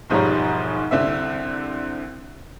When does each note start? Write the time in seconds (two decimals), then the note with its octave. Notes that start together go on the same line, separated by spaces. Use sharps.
0.10 E1 G#2 F3 G3 C#5 A#5
0.91 C2 D3 C4 E5